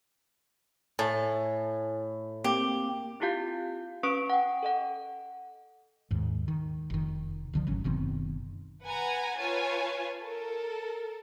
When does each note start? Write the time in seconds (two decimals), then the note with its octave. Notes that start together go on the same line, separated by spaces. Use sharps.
0.99 A2 G#5 A5
2.44 A#3 C4 G4
3.20 C4 E4 F4 G4 F5 G6
4.03 C#4 B4 C#6 D#6 F#6 D7
4.30 F#5 G5
4.63 A4 D#5 F#5
6.11 D#2 G#2
6.48 D#3
6.90 F1 D#3
7.53 D1 D3 F3
7.67 G#1 F#3 C#4
7.84 F#1 B2 D#3 C4
8.83 B4 F#5 G#5 A#5
9.38 F4 B4 C#5 G#5 A5
10.22 A4 A#4